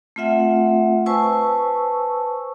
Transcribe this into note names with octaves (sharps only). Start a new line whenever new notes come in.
A3 C4 F4 E5 F#5
B4 C5 G#5 A5 C#6 E6